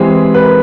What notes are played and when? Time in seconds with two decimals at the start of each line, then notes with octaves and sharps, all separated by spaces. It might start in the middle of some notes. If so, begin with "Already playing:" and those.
Already playing: E3 G#3 C4 G4 G#4
0.34 B4
0.44 A#4